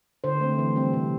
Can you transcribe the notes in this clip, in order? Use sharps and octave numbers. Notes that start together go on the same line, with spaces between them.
D3 C5
A3 C4
E3
G3 C4
C3